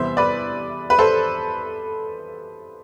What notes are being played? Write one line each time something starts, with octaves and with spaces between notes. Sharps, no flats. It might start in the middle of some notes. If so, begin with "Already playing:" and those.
Already playing: E2 C3 G3 B3 C5 E5
B4 D5
B4
A4 C5